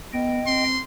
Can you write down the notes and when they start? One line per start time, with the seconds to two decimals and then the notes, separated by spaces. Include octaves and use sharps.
0.13 B3 D#5 G5
0.47 C4 C6